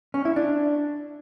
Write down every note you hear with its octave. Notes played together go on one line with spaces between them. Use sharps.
C#4
E4
D4